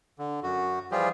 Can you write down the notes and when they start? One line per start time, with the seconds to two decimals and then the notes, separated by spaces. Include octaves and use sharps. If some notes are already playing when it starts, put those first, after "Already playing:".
0.19 D3
0.43 F#2 F#4
0.92 E3 F3 G3 F4 G4 G#4